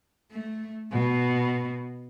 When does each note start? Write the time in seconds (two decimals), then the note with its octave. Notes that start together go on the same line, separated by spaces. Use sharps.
0.32 A3
0.93 B2